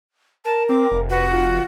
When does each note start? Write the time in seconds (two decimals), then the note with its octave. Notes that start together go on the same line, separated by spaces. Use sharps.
0.45 A#4 A5
0.69 C4 D6
0.91 F1
1.10 F#4 B4
1.30 F4